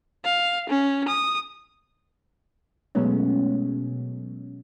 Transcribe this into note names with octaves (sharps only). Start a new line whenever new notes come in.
F5
C#4
D#6
B2 F#3 G#3 A3 B3 C#4